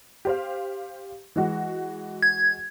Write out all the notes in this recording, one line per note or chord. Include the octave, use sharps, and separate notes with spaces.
G4 C5 F5
E3 G#3 F#4
G#6